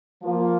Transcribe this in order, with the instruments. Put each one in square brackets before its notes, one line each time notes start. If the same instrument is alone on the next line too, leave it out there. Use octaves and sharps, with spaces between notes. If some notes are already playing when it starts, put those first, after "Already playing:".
[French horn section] F3 A#3 F4